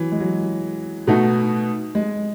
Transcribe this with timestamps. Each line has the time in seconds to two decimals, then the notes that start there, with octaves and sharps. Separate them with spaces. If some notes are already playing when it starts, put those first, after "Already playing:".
Already playing: E3 F#3
0.12 G#3
0.20 F#3
1.07 B2 A3 D#4 F#4
1.95 G#3